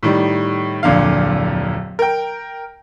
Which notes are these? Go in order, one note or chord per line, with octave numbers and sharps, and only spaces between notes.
A2 D#3 G3
D1 F2 A#2 D3 F5
A#4 G5